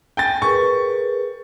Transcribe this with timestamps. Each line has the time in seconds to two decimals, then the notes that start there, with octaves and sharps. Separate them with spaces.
0.17 G5 G#5 A6
0.42 G#4 A#4 B4 C#6